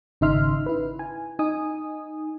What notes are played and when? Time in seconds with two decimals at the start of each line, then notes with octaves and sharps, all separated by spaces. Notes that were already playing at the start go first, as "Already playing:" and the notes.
0.21 G#1 C#3 D#4 E5 C6 F6
0.66 E4 B4
0.99 G#5
1.39 D#4 G#5 D#6